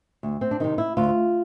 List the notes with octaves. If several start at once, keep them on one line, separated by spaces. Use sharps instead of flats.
D2
C4
D4
C3 D#3 D#4
E4
D2 F4